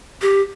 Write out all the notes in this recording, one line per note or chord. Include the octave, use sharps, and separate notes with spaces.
G4